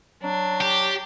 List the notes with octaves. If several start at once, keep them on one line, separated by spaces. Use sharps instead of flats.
F#3 D4
G4